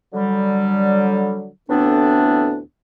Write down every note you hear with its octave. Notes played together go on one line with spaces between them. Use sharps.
D3 F#3 G3
D2 A2 E3 B3 C4 D4